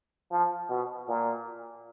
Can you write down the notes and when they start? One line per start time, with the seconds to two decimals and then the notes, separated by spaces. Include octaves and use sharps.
0.32 F3
0.69 B2
1.08 A#2